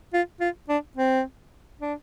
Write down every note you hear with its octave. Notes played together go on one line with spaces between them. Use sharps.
F4
F4
D4
C4
D4